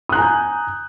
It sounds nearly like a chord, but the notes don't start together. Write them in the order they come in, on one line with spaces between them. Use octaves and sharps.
D#6 F#6 A#5 G#5 G6